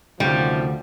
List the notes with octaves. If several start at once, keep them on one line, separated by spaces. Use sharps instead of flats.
D2 G#2 C3 D#3 F3 G3 C#4